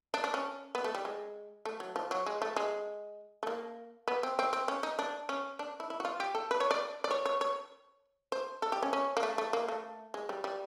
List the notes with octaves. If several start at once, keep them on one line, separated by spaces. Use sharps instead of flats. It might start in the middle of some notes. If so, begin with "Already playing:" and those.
D4
D4
C#4
B3
A3
G3
G#3
A3
F#3
F3
F#3
G#3
A3
G#3
A3
A#3
B3
C4
C4
C4
C#4
D#4
D4
C#4
D4
E4
E4
F#4
F4
G4
A4
B4
C#5
D5
D5
C#5
C#5
C#5
C5
A4
G4
C#4
C#4
A#3
A3
A3
A#3
A3
G#3
G3
G3